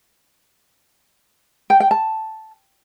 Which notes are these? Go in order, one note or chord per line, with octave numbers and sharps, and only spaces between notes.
G5
G5
A5